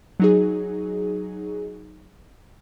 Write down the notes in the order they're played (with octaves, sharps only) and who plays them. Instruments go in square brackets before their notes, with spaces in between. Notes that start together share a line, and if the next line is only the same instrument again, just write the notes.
[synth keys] F#3 D#4 G#4